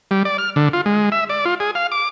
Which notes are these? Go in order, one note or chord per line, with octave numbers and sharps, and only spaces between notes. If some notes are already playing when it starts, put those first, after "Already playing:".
G3
D5
F6
D3
F4
G#3
E5
D5
F4
G#4
F5
D6